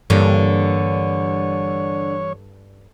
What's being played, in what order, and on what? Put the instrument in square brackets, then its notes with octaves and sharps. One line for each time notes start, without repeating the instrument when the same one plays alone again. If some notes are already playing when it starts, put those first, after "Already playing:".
[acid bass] G2 [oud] D3 [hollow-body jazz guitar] E3 G3 A#3 [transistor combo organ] C#5